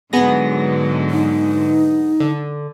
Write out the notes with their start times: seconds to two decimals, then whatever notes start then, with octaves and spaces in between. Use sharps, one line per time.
0.13 G#2 D3 F#3 B3 G#4 A#6
1.10 D#4
2.20 D3